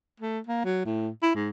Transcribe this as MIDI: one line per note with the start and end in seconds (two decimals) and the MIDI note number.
0.20 0.39 57
0.47 0.60 58
0.65 0.80 54
0.85 1.09 45
1.22 1.31 64
1.35 1.50 44